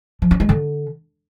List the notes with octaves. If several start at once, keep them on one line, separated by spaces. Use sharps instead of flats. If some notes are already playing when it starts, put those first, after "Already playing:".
F3
C#4
G#3
D3